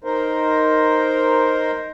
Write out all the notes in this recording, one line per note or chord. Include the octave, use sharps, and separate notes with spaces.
D#4 A#4 C5